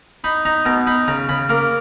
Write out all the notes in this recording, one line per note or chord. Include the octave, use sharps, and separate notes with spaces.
D#4 B5
D#4 A#5
B2 A#5
D#4 B5
C#3 A#5
C#3 B5
A#3 A#5